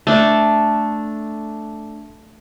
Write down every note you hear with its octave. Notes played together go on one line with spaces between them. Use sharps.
A3 D4